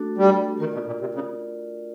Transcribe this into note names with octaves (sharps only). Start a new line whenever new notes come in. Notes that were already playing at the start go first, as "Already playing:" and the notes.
Already playing: A3 D4 F#4 A4
G3
D#3 F4 A#4 D5
B2
A#2
C3
C#3